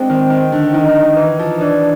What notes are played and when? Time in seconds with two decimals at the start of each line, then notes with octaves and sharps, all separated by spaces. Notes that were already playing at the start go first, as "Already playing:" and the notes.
Already playing: G#3 C4 D4 D#4
0.10 D#3
0.30 D#3
0.52 D3
0.74 D#3 D#4
0.88 D#3
1.03 D#3
1.17 E3
1.39 F3
1.60 E3 D4